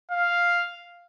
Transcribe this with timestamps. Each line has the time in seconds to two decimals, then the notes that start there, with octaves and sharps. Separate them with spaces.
0.11 F5